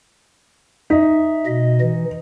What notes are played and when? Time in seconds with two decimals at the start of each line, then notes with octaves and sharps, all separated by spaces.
0.90 D#4 E5
1.46 B2 D#5
1.81 E3